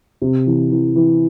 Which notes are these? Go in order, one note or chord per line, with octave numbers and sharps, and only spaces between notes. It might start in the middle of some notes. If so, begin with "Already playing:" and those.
C3
E3
E3
E3